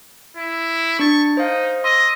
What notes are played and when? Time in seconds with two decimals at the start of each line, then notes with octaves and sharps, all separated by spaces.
0.37 E4
0.99 D4 C#6 A6
1.37 D#4 C5 F5
1.84 D#5 C6 E6 A#6